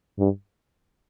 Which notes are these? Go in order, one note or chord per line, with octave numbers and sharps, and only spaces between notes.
G2